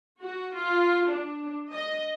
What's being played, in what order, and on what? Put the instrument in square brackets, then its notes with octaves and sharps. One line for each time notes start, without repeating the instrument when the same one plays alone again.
[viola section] F#4
F4
D4
D#5